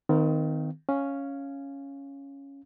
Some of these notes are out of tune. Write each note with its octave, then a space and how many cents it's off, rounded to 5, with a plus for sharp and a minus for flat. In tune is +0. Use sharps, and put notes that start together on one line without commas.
D#3 +0 C4 -45 F5 -25
C#4 +0 F5 +0